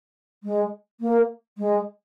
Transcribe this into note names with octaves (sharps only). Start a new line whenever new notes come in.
G#3
A#3
G#3